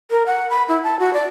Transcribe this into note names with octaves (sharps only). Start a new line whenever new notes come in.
A#4
F#5
B5
E4
A5
F#4
D5